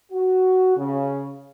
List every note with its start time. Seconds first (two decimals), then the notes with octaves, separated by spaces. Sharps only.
0.12 F#4
0.77 C#3